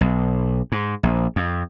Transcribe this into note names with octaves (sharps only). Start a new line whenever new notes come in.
B1
G#2
A#1
F2